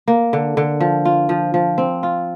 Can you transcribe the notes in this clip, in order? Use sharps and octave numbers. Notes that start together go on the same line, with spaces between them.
A#3
D3
D3
F3
F4
F3
F3
C4
F4